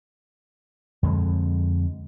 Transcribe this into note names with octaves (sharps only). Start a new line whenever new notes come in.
F2 D3 G#3